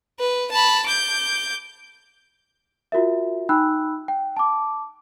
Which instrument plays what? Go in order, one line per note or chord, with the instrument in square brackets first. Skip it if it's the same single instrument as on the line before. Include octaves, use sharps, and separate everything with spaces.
[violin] B4
A5 B5
D6 G6
[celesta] F4 F#4 A#4 E5
D#4 G5 B5 E6 F#6
G5
A5 D6